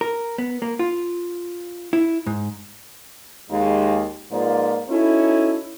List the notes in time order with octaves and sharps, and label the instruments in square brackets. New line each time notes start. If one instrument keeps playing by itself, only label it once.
[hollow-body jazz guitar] A#4
B3
A#3
F4
E4
G#2
[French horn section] D#2 G#3
G#2 F3 A#3 F4 B4 D5
C#4 D#4 E4 F#4 A4